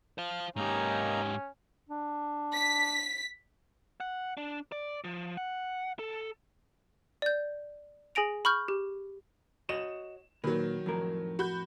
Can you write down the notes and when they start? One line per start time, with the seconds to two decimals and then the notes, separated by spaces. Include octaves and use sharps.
0.18 C5 F5 F6
0.56 G#2 A#3 C#4 D#4 G4 A#5
1.89 D4
2.53 B6
4.00 F#5
4.37 D4
4.72 D5
5.04 F3
5.37 F#5
5.99 A4
7.22 D5 G6
8.15 G#4 G#5 A#6 D7 F7
8.45 B5 C#6 F6 G6
8.68 G4
9.69 F#4 C#5 D#5 E7
10.44 A#2 D#3 F#3 B4
10.86 F2 A2 A#4
11.39 F#4 B5 G6